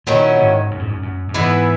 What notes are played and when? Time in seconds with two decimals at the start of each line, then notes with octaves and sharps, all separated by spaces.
0.07 A#2 D#3 F#3 C#4 E4
0.39 G#2
0.71 F#2
0.79 G#2
0.88 F#2
1.03 F#2
1.28 F#2
1.34 G#2 E3 B3 E4 B4